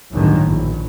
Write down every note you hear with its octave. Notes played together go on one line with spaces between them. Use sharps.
G1 C#2 F#2 A2 D3 D#3
A#1